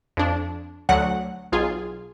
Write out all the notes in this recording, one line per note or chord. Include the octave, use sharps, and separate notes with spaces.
F2 D4
D2 F#3 F#5
B1 F4 G#4